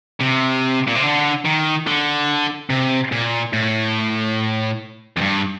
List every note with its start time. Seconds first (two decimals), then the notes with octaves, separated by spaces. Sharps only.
0.21 C3
0.88 A#2
0.96 C3
1.03 D3
1.46 D#3
1.87 D3
2.70 C3
3.12 A#2
3.53 A2
5.17 F2
5.21 G2